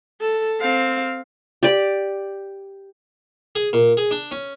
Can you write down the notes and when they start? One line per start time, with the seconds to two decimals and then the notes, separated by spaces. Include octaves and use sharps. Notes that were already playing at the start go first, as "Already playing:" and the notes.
0.21 A4
0.61 C4 F5
1.63 G4 D5
3.55 G#4
3.73 A#2
3.97 G#4
4.11 D4
4.31 C#4